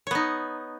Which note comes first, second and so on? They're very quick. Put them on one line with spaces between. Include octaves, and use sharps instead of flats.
C#5 B3 D#4